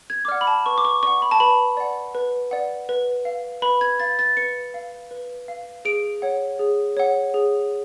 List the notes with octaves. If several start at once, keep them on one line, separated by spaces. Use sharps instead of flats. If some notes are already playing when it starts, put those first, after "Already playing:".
G#6
D6
D5 F#5 F6
B5
A5
B4 C#6
D6
C#6
D5 F#5 C#6
B5
A5
B4 B5
D5 F#5
B4
D5 F#5
B4
F5
B4 B5
G#6
F5 A6
A6
B4 C#7
F5
B4
F5
G#4 D7
C#5 F#5
G#4
C#5 F#5
G#4